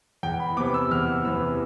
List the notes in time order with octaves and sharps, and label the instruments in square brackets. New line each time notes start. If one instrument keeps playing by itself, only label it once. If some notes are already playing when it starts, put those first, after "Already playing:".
[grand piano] E2 G5
B5
C3 E3 B3 D6
E6
E2 F6
C3 E3 B3 E6